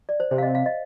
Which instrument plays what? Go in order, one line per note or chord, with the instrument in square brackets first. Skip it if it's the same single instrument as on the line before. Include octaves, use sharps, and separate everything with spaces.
[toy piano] D5
C5
[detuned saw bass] C3 [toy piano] C5
[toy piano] F5
D#5
F5
D#5